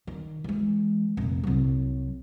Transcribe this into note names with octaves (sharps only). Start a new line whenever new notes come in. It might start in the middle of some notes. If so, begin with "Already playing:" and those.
D#3
E3 G#3
F1 A#1
C2 F#3